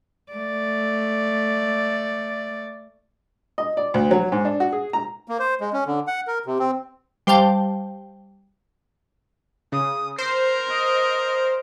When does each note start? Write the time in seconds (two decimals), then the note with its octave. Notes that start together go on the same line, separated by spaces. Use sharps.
0.32 A3 D5
3.58 D#5
3.77 D5
3.94 D2
4.11 F#3
4.32 G#2
4.45 D4
4.60 F#4
4.73 G#4
4.93 A#5
5.28 A#3
5.39 C5
5.61 G#3
5.73 C#4
5.87 D3
6.08 F#5
6.27 A#4
6.46 C3
6.59 C4
7.27 G3 C5 F5 G5 A5
9.72 C#3 D#6
10.18 A#4 C5 C7
10.69 D#5